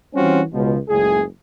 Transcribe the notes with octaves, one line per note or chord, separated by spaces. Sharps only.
E3 G3 C4 C#4 F4 F#4
C#2 B2 F3
F#1 C#2 A2 G#4